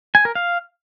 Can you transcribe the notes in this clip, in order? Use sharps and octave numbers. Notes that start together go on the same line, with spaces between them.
G#5
A#4
F5